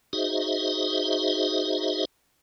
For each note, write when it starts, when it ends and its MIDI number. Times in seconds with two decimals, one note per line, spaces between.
0.13 2.05 63
0.13 2.05 66
0.13 2.05 68
0.13 2.05 72
0.13 2.05 75
0.13 2.05 76